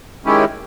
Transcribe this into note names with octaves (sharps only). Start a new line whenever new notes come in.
D#3 G#3 C#4 E4 G4